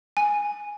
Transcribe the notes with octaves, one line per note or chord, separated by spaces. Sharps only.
G#5